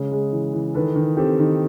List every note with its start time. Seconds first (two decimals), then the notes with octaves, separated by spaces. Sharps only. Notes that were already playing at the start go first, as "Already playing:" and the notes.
Already playing: C#3 G#3
0.11 G#3
0.32 E3
0.53 E3
0.74 D#3 A4 B4
0.96 D#3
1.17 C4 G4 A4
1.39 D#3